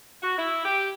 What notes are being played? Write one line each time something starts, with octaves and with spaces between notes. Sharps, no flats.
F#4
E4
G4